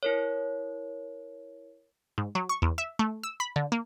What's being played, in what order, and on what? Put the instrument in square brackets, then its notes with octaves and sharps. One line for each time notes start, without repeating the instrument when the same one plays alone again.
[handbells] E4 A#4 C#5
[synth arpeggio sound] G#2
F#3
C#6
E2
E5
A3
E6
B5
D3
A#3